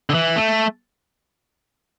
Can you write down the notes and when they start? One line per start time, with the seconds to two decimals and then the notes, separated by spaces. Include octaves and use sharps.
0.10 D3
0.14 E3
0.36 A3